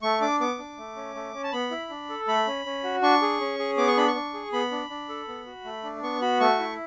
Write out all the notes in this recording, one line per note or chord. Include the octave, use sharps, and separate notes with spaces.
A3 C#6
D4 D6
B3 D6
D4
A3
C#4
A3
C#4
A5
B3 B5
E4
D4
A4
A3 B5
C#4
C#4
F#4
D4 C#6
G#4
C#4
G#4
B3 D6
C#6
D4 B5
C#6
D4
G#4
B3 B5
D4
D4
A4
B3
F#4
A3
D4
B3 C#6
F#4 B5
A3 C#6
E4